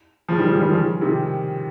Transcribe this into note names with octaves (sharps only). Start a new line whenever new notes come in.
C#3 F3
D#3 G3
F3 G#3
D#3 G3
C#3 F3
C3 D#3